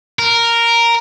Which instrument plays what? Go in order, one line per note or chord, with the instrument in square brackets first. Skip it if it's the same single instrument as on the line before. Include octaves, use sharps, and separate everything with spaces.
[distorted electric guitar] A#4